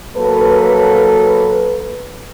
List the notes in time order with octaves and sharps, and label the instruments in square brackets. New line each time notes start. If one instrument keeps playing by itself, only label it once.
[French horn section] F#3 A#3 A4 B4